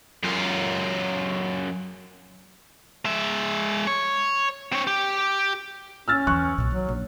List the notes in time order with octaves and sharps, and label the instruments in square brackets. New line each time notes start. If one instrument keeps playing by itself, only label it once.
[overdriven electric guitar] F#2 F4
[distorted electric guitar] G#3 E5
C#5
C4 C#5
G4
[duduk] C#4 [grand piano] E6 F6 A6
[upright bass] E2 E3 [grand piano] C#6 F#6
[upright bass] B1 A#2
[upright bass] D#3 [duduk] F#3
[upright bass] A#1